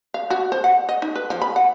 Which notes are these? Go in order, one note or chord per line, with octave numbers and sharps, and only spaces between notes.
F5
F#4
C5
F#5
D#5
D#4
B4
F3
B5
F#5